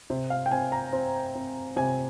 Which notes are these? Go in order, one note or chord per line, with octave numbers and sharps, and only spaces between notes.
C3
F5
G5
C4 G#5
A#5
C4
C4
C3 G#5